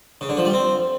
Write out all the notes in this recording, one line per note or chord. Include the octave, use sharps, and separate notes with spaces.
C#3
D3
F3
G3
C4